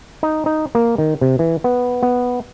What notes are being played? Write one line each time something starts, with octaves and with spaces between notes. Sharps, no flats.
D#4
D#4
A#3
D#3
C3
E3
B3
B3